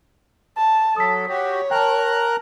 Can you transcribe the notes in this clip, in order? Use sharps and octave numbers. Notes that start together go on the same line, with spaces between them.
A5
F#3 A4 D#6 B6
F#4 G4 C#5
A#4 G5 A5 A#5 F#6